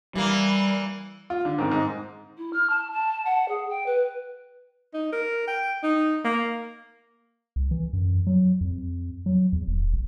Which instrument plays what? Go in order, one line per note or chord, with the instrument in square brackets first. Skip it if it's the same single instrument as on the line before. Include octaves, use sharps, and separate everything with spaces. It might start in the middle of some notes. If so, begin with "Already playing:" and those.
[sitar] E3 A#3 [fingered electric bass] G3
[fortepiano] F4
D3
G#2 D#3 C4
G#2 D#5
[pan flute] E4
F6
A5
A5
F#5
G#4
G5
B4
[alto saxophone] D#4
A#4
G5
D#4
A#3
[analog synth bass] C2
E3
F#2
F#3
F2
F#3
E2
D1
A1